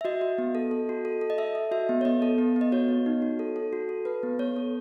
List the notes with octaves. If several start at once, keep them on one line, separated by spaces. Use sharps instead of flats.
E5
F#4 D#5
F#4
B3
A4
A4
F#4
A4
A4
D#5
A4 E5
A4
F#4 E5
B3
C#5
B3 D#5
A4
B3
B3 D#5
F#4 C#5
B3
D#4
F#4
A4
A4
F#4
A4
A4 B4
B3
B3 C#5
A4